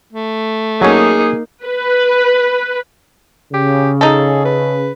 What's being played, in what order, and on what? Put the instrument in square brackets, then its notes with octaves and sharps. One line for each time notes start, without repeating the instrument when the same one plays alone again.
[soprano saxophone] A3
[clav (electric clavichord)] F#3 C#4 [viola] A#3 D#4 [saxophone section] G#4
[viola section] B4
[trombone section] C#3 [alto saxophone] G4
[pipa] D#4 A4 [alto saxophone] G#4
[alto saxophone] B4